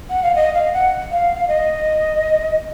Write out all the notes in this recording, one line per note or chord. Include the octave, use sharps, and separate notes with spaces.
F#5
F5
D#5
F5
F#5
F5
D#5